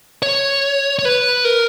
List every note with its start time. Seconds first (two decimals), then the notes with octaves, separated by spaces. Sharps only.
0.22 C#5
0.99 C#5
1.05 B4
1.45 A#4